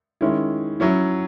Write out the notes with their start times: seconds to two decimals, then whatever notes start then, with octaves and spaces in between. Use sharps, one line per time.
0.21 D#3 G#3 C#4 E4
0.80 F#3 C#4 E4